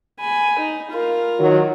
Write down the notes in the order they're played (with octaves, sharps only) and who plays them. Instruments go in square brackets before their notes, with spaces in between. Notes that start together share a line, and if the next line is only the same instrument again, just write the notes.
[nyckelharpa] G#5 B5
D#4
F4 A#4
[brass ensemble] D#3 F#3